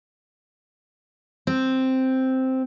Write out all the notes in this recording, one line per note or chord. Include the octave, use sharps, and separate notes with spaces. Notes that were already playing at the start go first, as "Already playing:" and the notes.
C4